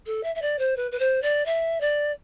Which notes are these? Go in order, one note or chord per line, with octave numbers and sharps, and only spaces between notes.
A4
E5
E5
D5
C5
B4
B4
C5
D5
E5
D5